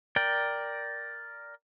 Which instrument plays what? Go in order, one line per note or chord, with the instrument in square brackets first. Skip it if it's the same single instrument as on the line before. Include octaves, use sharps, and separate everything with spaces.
[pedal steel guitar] A#4 D5 G5